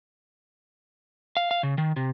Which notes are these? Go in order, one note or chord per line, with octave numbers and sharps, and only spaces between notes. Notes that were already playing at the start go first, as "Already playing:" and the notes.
F5
F5
C#3
D#3
C3